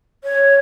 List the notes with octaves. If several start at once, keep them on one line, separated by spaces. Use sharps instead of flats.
C#5